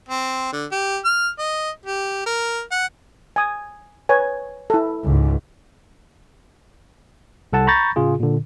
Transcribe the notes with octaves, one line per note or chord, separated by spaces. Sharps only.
C4
D3
G4
F6
D#5
G4
A#4
F#5
G#5 D#6
B4 C#5 G#5
E4 A4
C#2 G#2
C2 A4 F#5 A5
A#5 B5 C#6 G6 A6 A#6
A2 C#3 F4 G#4
A#2 D3